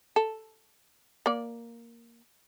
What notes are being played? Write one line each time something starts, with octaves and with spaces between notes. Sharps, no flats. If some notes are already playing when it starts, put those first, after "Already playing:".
A4
A#3 D5